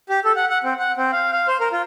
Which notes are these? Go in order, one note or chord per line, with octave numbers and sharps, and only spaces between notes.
G4
A4
F#5
F#5
C4
F#5
C4
F5
F5
C5
A#4
F4